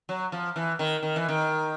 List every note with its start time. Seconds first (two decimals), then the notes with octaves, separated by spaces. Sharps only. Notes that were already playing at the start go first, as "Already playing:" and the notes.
0.09 F#3
0.32 F3
0.56 E3
0.79 D#3
1.03 D#3
1.16 E3
1.29 D#3